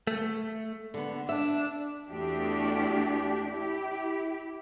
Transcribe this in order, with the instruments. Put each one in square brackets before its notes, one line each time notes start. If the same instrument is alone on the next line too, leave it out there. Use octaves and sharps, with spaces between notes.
[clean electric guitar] A3
[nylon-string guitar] D3 B3
[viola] D4 [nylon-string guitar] E5
[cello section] E2 A3 D4 F#4 G4
E4 G4